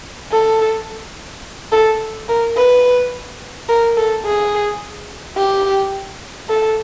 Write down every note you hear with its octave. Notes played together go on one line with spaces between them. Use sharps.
A4
A4
A#4
B4
A#4
A4
G#4
G4
A4